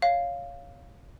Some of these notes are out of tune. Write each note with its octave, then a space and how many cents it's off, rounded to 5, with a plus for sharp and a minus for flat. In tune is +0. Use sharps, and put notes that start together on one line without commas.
C#5 +15 F5 +0